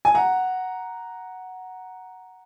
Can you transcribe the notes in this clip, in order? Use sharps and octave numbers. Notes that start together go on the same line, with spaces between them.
G#5
F#5 A#5